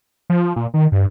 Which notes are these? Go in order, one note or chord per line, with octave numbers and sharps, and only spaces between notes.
F3
A#2
D#3
G2